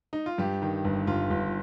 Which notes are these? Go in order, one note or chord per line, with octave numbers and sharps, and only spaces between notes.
D#4
F4
G2 G4
D#3
G1
G1 F4
G1